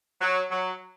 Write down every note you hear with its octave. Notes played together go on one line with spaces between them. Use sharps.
F#3
F#3